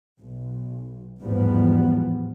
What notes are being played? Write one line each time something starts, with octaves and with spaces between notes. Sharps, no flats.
B1
A1 E2 G#2 F3 G3 B3